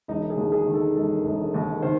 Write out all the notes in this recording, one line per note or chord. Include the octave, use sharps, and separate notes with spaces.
E1 D#4
G#4
D#2
G#4
D#3
A4
E1 A4
E1
D#2
D#3 C5